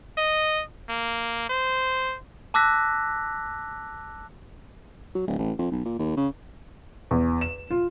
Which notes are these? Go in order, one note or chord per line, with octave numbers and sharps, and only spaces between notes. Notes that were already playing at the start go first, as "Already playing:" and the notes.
D#5
A#3
C5
A5 D6 E6 F#6 A#6 B6
F#3
D1
A1
F2
B1
A#2
D#2
C#3
E2
E7
F4